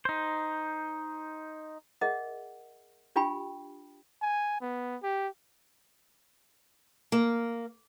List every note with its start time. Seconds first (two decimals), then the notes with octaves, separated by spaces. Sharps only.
0.05 D#4 C5
2.01 G#4 A#4 D#5 E5 F#5
3.16 D4 F4 G4 G5 G#5 B5
4.22 G#5
4.61 B3
5.03 G4
7.12 A#3